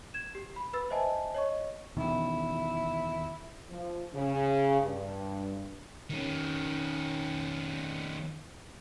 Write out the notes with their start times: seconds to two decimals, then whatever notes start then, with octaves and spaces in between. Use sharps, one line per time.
0.14 G#6 E7
0.35 G4
0.56 B5
0.73 B4 B5 E6 A6
0.90 C5 D#5 E5 G#5 A5
1.34 C#5 D#5 C#6
1.97 E2 B2 D#3 E4
3.69 F3
4.14 C#3
4.81 G2
6.10 D#3 C#4